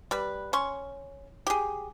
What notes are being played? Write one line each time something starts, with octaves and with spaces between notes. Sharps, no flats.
G3 B4
C#4 C6 C#6
G4 G#4